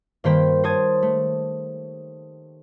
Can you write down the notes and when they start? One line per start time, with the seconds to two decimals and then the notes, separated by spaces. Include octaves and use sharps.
0.24 G2 D#3 A#3 C5 G5 B5
0.64 C5 C#5 A5 D#6 G#6
1.02 A3